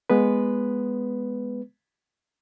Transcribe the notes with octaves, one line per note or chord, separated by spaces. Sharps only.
G#3 B3 B4